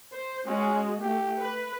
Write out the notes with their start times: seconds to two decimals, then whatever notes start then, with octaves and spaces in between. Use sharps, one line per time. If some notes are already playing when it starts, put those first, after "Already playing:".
0.13 C5
0.47 G#3 C#4 F#4
1.02 A3 G4
1.40 B4